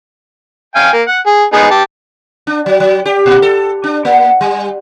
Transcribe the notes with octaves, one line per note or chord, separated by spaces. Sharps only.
F5 G5 G#5
A#3
F#5
G#4
B3 D#4 G#4
G4 A5
D4
F#3
F#3
G4
A#2
A4
D4
A#3
G3